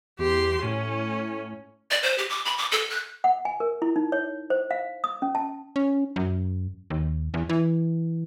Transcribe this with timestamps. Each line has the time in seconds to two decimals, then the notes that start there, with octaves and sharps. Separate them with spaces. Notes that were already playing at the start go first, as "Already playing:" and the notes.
0.19 E2 G4 C6
0.63 A2 C#4
1.91 D5
2.03 C5
2.18 G4
2.30 D6
2.45 B5
2.58 D6
2.72 A4
2.90 F#6
3.24 F#5
3.45 G#5
3.60 A#4
3.82 E4
3.96 D#4
4.12 C#5
4.50 C5
4.71 F5
5.04 D#6
5.22 C#4
5.35 A5
5.76 C#4
6.16 F#2
6.90 D#2
7.34 E2
7.49 E3